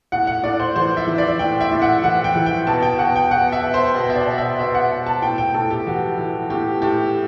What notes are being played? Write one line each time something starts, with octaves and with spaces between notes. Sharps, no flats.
A2 F#5
F#5
A2 D5
C5
E3 C5
E5
E3
D5
A2 G5
E5
A2
F#5
E3 F#5
G5
E3
G5
B2 A5
G5
B2 F#5
G5
B2 F#5
E5
B2
C5
B2
E5
D5
B2
E5
B2 E5
F#5
B2
A5
A2 G5
G5
A2 A4
G4
E3 F#4
E3
A2 G4
A2 G4